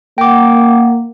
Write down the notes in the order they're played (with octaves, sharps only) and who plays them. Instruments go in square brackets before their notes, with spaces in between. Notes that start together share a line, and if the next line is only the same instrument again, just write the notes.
[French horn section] A#3 [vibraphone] A#4 F#5 [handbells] G5 D6